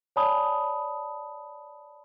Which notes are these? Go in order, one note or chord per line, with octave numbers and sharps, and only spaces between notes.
C#5 D5 G#5 A5 B5 D#6